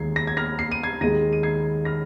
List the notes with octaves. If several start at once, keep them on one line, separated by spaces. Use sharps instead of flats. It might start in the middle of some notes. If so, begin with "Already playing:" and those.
Already playing: D#2 D#3 G#3 G#6 C7
A#6
G#6
F6 A#6
C7
D#7
G#6 C7
D#2 D#3 G#3 A#6 D#7
D#7
G#6 C7
F6 A#6